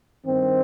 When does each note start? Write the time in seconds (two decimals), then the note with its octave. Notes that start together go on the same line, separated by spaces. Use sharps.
0.24 G2 D#3 C4